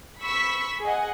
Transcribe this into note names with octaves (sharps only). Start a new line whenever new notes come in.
B5 C#6 E6 B6
G#4 D#5 F#5